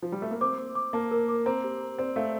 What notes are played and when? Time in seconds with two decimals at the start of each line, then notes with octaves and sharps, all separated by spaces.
0.02 F3
0.12 G3
0.22 A3
0.31 A#3
0.41 C4 D6
0.58 D6
0.75 D6
0.93 A#3 A5
1.11 A#4
1.28 D6
1.46 C4 A#5
1.64 G4
1.80 A#5
1.98 C4 D5
2.16 A3 F5